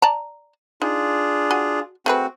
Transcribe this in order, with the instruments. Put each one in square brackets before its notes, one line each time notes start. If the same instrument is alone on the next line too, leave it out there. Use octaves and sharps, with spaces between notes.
[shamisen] D5 A5 A#5
[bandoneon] D4 F4 G#4 [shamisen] D#4
[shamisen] F#4 G#5
[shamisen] A3 G#4 B4 [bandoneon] C4 F#4